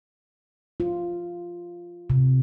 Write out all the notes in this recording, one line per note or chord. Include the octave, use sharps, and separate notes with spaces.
F4
C3